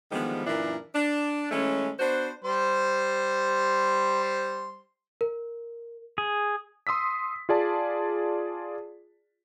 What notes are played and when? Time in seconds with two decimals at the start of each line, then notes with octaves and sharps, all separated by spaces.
0.12 D3 D#3 F3 G3 G#3 B3
0.46 F#2 A#2 E3 D4 E4 A#4
0.95 D4
1.51 E3 G#3 A3 C#4
2.00 B3 D4 F#4 C5
2.45 G3 C5 C6
5.21 A#4
6.18 G#4
6.87 C6 D#6 E6 B6
7.49 F4 G#4 D5 A5